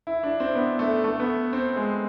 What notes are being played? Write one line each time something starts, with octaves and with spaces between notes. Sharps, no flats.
E4
D4
C4
B3
A3
A3
B3
C4
G#3